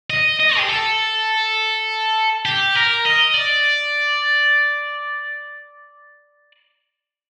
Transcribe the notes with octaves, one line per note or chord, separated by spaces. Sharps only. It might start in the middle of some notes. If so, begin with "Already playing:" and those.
D#5
D#5
G4
A4
G4
A#4
D#5
D5